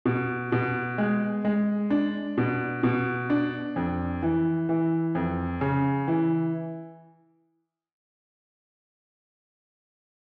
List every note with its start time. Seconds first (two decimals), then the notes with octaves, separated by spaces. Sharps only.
0.05 B2
0.52 B2
0.98 G#3
1.45 G#3
1.90 D4
2.38 B2
2.83 B2
3.30 D4
3.76 F2
4.23 E3
4.69 E3
5.15 F2
5.61 C#3
6.08 E3